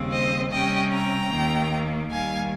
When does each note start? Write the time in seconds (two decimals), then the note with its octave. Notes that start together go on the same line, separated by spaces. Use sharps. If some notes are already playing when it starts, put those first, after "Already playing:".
Already playing: D#2 C#3 G3 C4
0.12 C5 D#5
0.51 C3 G3 C#4 D#5 G5
0.91 G5 A#5
1.30 D#2 D#3 A#3
2.10 D#2 D#3 G3 F5 G#5